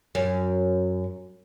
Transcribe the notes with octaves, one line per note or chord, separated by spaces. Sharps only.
F#2